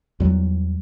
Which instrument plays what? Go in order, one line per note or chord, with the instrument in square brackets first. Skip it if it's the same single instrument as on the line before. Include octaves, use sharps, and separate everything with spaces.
[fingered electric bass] E2 F#3 G3